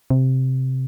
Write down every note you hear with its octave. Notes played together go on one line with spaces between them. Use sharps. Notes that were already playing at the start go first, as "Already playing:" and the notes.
C3